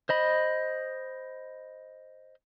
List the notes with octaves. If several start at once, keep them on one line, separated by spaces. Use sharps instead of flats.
C5 D#5 B5